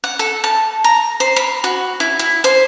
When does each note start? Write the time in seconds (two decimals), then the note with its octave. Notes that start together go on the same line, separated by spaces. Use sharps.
0.04 F#5
0.19 A4
0.44 A5
0.84 A#5
1.20 C5
1.36 B5
1.64 F#4
2.00 E4
2.19 E4
2.44 C5